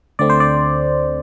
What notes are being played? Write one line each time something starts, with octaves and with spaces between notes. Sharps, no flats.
D2 D3 A3 C4 D5
C5
D5